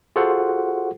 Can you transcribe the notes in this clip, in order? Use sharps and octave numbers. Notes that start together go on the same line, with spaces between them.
F4 F#4 G#4 A4 C5 F#5